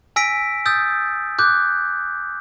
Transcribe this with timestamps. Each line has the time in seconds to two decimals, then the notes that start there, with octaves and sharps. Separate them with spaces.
0.16 G#5 E6 A#6 B6 D7
0.66 D#6 E6 G6 A6
1.39 D6 F#6 G6